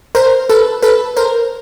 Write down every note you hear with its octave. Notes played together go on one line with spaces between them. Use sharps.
A#4 C5
A4 B4
A4 B4
A#4 C5